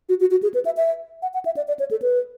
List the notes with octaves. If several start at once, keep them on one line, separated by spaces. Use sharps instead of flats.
F#4
F#4
F#4
G#4
B4
E5
E5
F#5
F#5
E5
D5
D5
C#5
A4
B4